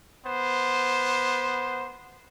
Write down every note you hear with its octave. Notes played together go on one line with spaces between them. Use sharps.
B3 C5